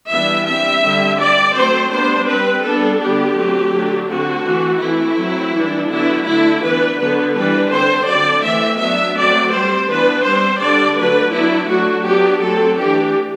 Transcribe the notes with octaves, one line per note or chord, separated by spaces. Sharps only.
E3 G3 B3 D4 E5
G3 C4 E5
D3 G3 C4
G3 C4 D5
F#3 A3 C4 C5
G3 B3 D4 C5
G3 C4 B4
G3 B3 D4 A4
D3 G3 B3 D4 G4
F#3 A3 C4
D3 F#3 A3 D4
D3 A3 C4 F#4
E3 A3 C4
E3 A3 C4 E4
F#3 C4
E3 G3 D4
D3 F#3 B3 D4 E4
D3 A3 D4 E4
E3 B3 D4 B4
D3 F#3 B3 B4
E3 G3 D4 B4
D3 G3 C4 C5
D3 F#3 C4 D5
E3 A3 C4 E5
F#3 B3 D4 E5
F#3 A3 C4 D5
G3 C4 C5
E3 B3 D4 B4
G3 C4 C5
D3 G3 D4 D5
D3 F#3 A3 D4 B4
F#3 B3 D4 E4
F#3 A3 D4 F#4
F#3 B3 D4 G4
F#3 A3 C4 A4
E3 A3 D4 G4